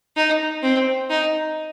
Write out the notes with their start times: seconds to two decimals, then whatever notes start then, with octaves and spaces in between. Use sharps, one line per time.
0.16 D#4
0.63 C4
1.10 D#4